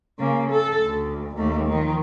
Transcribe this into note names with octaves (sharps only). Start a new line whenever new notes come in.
C#3 A#3
A4
D2
D#2 A3
D#3 F3